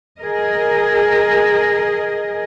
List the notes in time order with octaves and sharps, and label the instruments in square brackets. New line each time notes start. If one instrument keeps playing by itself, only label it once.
[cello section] G#4 A#4 D#5